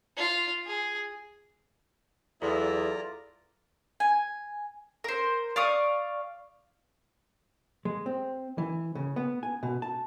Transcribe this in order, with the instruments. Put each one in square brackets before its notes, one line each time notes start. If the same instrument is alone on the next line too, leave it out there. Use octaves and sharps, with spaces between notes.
[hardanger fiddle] F4
G#4
[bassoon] E2 [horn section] F#3 B3 E4 [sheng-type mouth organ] F4 D5 A#5 [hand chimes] A4
[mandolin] G#5
A#4 C5
D5 F5 C#6 D#6
[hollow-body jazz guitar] G#3
C4
E3
C#3
B3
G#5
B2
A5